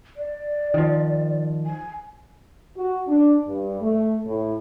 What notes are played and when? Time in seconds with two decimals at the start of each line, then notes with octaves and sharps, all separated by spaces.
0.17 D5
0.74 D#3 F3
1.66 G#5
2.77 F#4
3.07 D4
3.47 G2
3.81 A3
4.25 A2